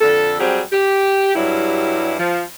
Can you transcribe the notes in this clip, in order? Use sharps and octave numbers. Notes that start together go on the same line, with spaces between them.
F2 D3 A4
F#3 G3 C4 G4 G#4
G4
G2 F#3 G3 E4
F3